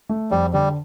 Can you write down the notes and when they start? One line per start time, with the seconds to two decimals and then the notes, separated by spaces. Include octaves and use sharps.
0.09 A3
0.31 F2 G3
0.53 D3 G3